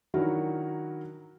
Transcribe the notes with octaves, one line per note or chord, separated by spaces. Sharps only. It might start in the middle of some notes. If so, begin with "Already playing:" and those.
D#3 F#3 D4 E4 F#4 A#4